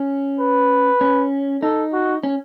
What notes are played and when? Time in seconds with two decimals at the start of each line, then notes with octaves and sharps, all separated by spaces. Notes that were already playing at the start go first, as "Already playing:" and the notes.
Already playing: C#4
0.40 B4
1.01 C#4
1.62 D#4 A4
1.93 F#4
2.23 C#4